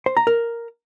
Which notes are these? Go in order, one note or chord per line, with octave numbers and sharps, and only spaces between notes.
C5
A#5
A#4